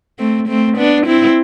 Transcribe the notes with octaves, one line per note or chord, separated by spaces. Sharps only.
A3 C4
A3 C4
B3 D4
C4 E4